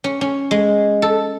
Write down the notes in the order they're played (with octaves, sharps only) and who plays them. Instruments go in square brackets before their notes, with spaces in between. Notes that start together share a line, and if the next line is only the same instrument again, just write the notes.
[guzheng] C#4
C#4
G#3
A4